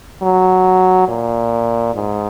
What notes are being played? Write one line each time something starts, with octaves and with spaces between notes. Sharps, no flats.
F#3
A#2
G#2